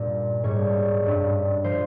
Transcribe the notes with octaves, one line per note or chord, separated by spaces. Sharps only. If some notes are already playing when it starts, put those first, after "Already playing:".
Already playing: G2 A#2 G3
G#2 G3 C#5
G2 G3
F3 C5